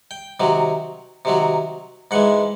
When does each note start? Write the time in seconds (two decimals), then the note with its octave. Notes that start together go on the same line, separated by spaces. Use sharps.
0.11 G5
0.40 C3 D#3 F#3
1.25 C3 D#3 F#3
2.11 G#2 E3 G#3 F#5